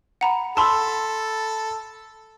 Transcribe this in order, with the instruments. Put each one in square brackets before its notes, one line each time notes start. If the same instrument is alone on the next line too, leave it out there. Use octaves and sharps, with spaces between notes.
[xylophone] F#5 A#5 B5
[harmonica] A4 [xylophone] A5 C6 [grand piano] B5 E6